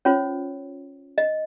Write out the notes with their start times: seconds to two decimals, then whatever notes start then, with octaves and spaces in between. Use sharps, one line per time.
0.05 C#4 F4 C5 C#5
1.18 D#5